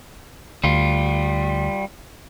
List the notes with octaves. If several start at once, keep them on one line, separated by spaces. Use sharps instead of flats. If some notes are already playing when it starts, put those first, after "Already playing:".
D2 G3 F4